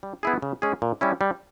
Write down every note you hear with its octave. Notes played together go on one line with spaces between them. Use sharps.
G3
B3 E4 G#4
C#3
G#3 C#4 G#4
A#2
G3 C#4 E4
G3